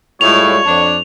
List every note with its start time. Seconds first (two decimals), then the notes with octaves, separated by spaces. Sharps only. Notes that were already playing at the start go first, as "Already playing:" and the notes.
0.21 A2 G3 G#3 F4 C#5 F7
0.66 F2 D4